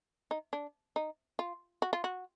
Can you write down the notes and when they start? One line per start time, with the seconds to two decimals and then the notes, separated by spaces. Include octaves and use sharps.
0.31 D#4
0.53 D4
0.96 D#4
1.39 F4
1.82 F#4
1.93 F4
2.04 F#4